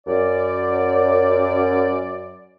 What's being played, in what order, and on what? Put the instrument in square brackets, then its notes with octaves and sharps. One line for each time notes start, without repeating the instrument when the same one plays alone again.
[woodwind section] F#2 D5